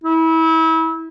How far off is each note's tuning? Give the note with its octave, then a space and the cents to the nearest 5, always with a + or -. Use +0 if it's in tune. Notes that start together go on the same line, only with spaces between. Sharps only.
E4 -30